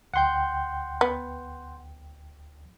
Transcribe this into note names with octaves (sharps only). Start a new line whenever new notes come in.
D2 F#5 G5 C6 G6
B3